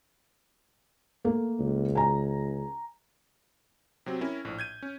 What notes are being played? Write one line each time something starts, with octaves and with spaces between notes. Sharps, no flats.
A3 A#3
C#2
G#5 A#5
C3 F#3 C4
C#4 E4 A#4
A#1 A2
G6 G#6 D#7
C#4